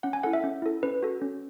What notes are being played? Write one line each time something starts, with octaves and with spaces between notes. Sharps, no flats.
C#4 F#5
G#5
E4 A4 F#5
E5
C#4
E4 A4
C#4 B4
F#4 A4
C#4